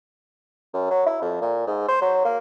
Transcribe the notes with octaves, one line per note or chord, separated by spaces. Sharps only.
F#2
F#3
E4
F2
A#2
G#2
C5
F#3
A#3